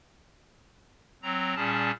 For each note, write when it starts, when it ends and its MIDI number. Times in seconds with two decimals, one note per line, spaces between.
1.23 1.54 54
1.23 1.54 60
1.23 1.54 82
1.56 1.91 46
1.56 1.91 55
1.56 1.91 61
1.56 1.91 68
1.56 1.91 81